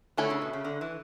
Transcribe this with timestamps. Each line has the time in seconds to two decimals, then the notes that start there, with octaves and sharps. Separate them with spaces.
0.17 D3 A3 C#4 E4 A4
0.30 C#3
0.42 B2
0.53 C#3
0.65 D3
0.81 E3